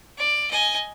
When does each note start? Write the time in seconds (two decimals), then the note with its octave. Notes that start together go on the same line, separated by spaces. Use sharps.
0.18 D5
0.51 D#5 G#5